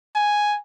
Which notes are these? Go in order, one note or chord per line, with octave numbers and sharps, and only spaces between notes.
G#5